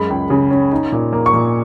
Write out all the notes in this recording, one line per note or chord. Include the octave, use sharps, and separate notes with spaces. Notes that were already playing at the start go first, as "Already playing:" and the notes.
Already playing: F#2 G#3 B5
C#2
C#3
C#4
D#4
A#2
A#3
C#6
A#2